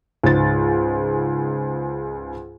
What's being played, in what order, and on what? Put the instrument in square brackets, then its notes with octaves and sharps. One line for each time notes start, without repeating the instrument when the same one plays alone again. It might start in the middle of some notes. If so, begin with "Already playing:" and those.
[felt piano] C#2 G#2 A6